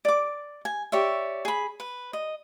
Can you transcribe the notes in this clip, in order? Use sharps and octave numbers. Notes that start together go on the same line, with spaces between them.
D5 D6
G#5
G4 C#5 D5 E5
G#4 B5
B4
D#5